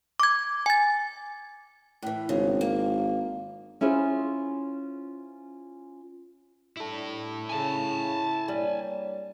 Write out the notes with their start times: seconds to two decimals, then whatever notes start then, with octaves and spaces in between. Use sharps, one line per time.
0.20 D6 G#6
0.66 G#5 A6
2.03 A2 E3
2.29 G#1 C#3
2.61 A#3
3.81 C#4 E4 F4 G#4 C5
6.77 G3 D4 E4 A4
7.49 C#3 G#5 A5
8.48 G3 A#3 D4 C#5